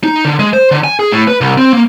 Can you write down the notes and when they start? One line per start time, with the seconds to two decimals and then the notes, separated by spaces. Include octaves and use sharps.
0.03 D#4
0.25 D3
0.39 G#3
0.53 C5
0.71 D3
0.84 G#5
0.99 G#4
1.12 A2
1.27 B4
1.41 C2
1.58 C4
1.73 A#3